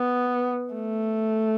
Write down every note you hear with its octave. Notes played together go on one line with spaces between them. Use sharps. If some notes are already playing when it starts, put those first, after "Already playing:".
Already playing: B3
A3